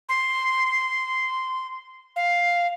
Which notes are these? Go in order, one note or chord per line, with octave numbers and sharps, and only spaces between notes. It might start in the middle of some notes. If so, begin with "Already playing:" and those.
C6
F5